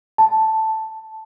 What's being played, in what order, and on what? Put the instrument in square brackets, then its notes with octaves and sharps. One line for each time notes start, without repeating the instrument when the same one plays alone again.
[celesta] A5